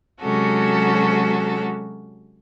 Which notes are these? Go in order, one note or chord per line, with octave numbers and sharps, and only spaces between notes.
C3 F#3 G#3 C#4 F#4 A4